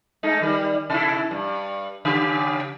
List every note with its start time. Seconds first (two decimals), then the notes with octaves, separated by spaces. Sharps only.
0.23 G#3 A3 D#4
0.42 D#3 G3
0.90 C3 E4
1.31 G2
2.05 C#3 G4